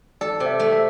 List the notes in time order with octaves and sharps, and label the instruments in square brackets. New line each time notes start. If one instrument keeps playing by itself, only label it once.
[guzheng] A4 [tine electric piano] D5
[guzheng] C3
[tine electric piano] E5
[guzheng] A3
[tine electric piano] E5